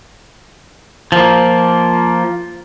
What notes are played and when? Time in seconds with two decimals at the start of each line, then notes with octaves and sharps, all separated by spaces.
1.12 F3 A#3